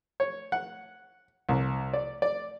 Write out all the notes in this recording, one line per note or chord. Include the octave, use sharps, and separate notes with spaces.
C#5
F#5
C2
D5
D5